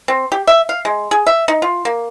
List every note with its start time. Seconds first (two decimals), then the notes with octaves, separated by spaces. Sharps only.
0.08 C4
0.32 G4
0.47 E5
0.69 F5
0.85 G#3
1.11 G#4
1.26 E5
1.48 D#4
1.62 F4
1.85 A#3